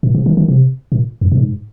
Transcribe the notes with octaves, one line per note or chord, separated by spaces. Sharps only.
A#2
C3
D#3
D#3
C3
A#2
F2
A#2
G#2